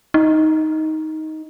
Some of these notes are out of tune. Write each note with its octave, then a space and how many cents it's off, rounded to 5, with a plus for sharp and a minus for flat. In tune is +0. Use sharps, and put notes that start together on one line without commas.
D#4 +10